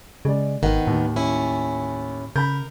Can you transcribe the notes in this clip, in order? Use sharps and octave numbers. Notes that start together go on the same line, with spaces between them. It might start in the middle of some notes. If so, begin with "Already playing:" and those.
C#3 G#3 D5
G#1 D#3 B3 F#5
D#2 A2
C#4 E4
C#3 A#4 B5 G6